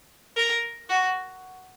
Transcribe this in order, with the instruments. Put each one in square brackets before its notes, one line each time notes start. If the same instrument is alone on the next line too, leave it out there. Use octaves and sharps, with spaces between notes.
[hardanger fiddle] A#4
F#4